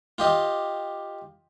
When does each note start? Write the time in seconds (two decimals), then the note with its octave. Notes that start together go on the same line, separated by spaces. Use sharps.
0.18 F4 G4 D#5